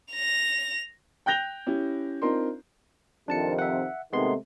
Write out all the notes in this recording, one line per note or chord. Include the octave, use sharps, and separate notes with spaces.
A#6 F7
G5 F#6 G6 A#6 F7 G7
C#4 E4 G4
C4 D4 D#4 F4 A#4 C6
F2 C3 D#3 D4 A5 C#7
E5 F#5
C3 D#3 G#3 A3 B3 C6